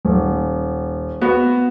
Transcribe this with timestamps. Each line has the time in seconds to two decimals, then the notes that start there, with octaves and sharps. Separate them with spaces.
0.05 D#1
1.21 B3 F#4